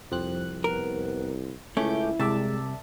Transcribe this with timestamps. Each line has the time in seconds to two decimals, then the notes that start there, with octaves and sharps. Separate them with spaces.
0.12 C2 F2 C4 F#6
0.64 B3 A#4
1.77 C#2 A3 C#4 E4 D6 G6
2.19 C2 C3 G#3 D5 E5 A5